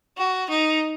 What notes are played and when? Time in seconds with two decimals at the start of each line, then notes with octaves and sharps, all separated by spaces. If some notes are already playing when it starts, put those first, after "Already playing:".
0.17 F#4
0.50 D#4